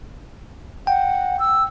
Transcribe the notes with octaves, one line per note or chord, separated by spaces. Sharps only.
F#5 G5
E6